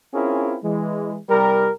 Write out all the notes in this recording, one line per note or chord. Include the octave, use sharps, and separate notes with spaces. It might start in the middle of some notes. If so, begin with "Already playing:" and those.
C4 C#4 E4 F4 G#4 A#4
E3 G#3
C2 G3 G4 A#4